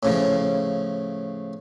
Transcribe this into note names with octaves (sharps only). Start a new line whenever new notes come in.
A2 C#3 F3